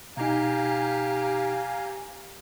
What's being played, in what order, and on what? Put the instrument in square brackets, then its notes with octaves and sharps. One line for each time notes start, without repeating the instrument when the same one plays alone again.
[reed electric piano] B2 D#4 [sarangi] G4 [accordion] F5 G#5 A#5